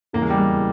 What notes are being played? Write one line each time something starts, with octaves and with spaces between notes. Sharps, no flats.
E2 C#3 E3 A#3
G#3
G3
G#3
C#3 E3